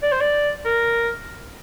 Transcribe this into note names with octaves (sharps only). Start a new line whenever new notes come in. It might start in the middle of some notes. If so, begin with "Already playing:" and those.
D5
C5
D5
A#4